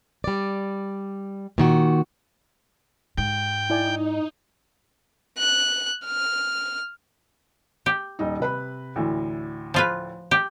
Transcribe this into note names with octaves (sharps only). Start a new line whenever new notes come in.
G3 D5
A#2 D#3 F#4
G#2 G5
D#4 E4 D5 G#5
F#6
F6
G4
D#1 D#4
C3 B4 B5
D2 A2 E3
F3 F4 B4
G4